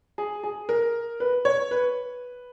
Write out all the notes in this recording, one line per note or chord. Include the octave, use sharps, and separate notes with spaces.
G#4
G#4
A#4
B4
C#5
B4